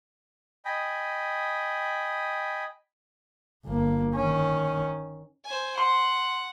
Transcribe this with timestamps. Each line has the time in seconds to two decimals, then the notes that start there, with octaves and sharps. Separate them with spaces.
0.65 D#5 G5 G#5 B5
3.65 G1 A#3
4.15 D#3 C#4
5.45 C5 G#5
5.78 F#5 C6